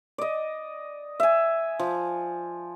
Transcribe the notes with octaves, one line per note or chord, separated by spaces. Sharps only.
D5 D#5
E5 G#5
F3